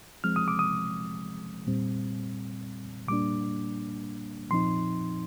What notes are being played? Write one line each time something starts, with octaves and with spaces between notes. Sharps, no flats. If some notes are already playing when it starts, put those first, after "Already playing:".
F3 G#3 C4 F6
D#6
D6
D#6
A#2 G3 C4
A#2 G3 A#3 D4 D6
A#2 F3 C4 D#4 C6